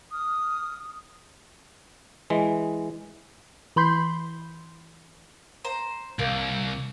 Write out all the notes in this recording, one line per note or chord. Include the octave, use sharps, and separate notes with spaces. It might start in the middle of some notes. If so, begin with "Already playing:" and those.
D#6 F6
E3 G#3
E3 B5 C6 G6
C5 A#5
C2 A#3